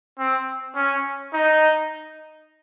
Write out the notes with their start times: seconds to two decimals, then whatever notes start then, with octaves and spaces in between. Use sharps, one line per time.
0.19 C4
0.75 C#4
1.34 D#4